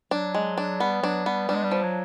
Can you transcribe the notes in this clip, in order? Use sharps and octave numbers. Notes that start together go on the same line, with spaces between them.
F#3 D4
G#3
D4
G3 B3
F#3 D4
G3 B3
G3 D4
G#3
G3
F3
F#3